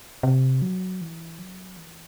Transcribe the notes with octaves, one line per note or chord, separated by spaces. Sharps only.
C3
F#3
E3
F#3
E3